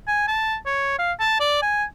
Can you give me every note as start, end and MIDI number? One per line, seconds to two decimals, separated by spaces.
0.08 0.28 80
0.28 0.56 81
0.66 0.97 73
0.99 1.12 77
1.20 1.38 81
1.40 1.61 74
1.62 1.84 80